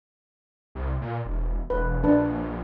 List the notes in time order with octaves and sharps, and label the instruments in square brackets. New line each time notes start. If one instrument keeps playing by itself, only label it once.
[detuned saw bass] C2
A#2
E1
[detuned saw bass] E1 [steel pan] B4
[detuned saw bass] A#1 [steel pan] D4 B4 A5